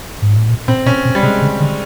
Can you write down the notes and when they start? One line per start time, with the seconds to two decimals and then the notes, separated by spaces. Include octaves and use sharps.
0.22 G#2
0.36 A2
0.49 A#2
0.68 A#2 C4
0.86 B2 C#4
1.05 B2
1.15 G3
1.23 C3 G#3
1.42 C#3
1.60 D3